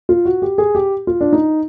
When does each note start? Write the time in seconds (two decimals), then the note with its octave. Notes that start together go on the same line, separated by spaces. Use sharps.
0.09 F4
0.25 F#4
0.42 G4
0.58 G#4
0.75 G4
1.07 F4
1.21 D4
1.33 D#4